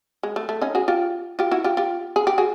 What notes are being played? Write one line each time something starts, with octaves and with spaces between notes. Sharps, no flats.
G#3
A3
A3
C#4 D#4
F#4 G#4
F4 G4
F4 G4
E4 F#4
F4 G4
F4 G4
G#4
G4
F#4 G#4